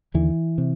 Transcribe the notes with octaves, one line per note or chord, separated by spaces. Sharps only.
D#2 D3 E3
C3